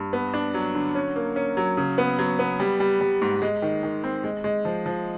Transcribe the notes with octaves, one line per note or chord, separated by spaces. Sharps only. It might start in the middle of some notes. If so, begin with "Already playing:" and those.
Already playing: G2
B3
D4
F#3
D3
C#4
A#3
C#4
F#3
C#3
B3
F#3
B3
G3
G3
G3
G#2
G#3
D#3
D#3
C4
G#3
G#3
F3
F3